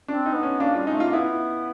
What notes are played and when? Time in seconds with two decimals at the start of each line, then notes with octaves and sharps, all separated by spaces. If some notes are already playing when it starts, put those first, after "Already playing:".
0.08 C4 D4
0.26 D#4
0.34 B3
0.43 C#4
0.60 A#3 D4
0.74 G3 F4
0.87 G#3 D#4
0.95 A3
1.00 A#3 F4
1.13 B3 E4